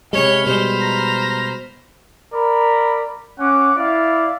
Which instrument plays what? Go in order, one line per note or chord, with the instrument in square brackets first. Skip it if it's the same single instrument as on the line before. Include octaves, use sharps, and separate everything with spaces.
[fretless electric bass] C3 G#3 [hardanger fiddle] C#5 [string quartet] B5 F6 [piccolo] G7
[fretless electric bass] B2 G3 G#3 [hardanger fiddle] C5
[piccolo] A#5
[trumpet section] A#4 D5 B5
C#4 F#5 D6
E4 D5 F5